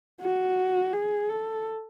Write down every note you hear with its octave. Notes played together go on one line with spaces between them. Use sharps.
F#4
G#4
A4